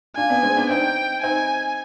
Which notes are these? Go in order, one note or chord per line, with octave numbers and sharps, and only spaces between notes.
D4 F4 G#5
B3 D4
G#3 C4
B3 D4
C4 D#4 G5
C4 D#4 G#5